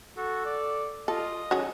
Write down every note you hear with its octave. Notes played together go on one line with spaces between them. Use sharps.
F#4 A4
D5
F4 A4 D#5
E2 D#3 F#3 C#4 G#4 A4